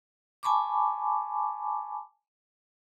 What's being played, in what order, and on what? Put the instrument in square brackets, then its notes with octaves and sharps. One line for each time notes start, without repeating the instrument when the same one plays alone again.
[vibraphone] G#5 A5 B5 C#6 D6